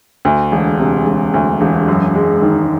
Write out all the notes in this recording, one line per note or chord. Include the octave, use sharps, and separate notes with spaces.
D2
E1
C3
E1
D2
E1
F#2
G#3
D#3